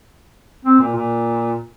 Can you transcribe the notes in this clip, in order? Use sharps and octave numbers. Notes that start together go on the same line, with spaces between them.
C4
A#2
A#2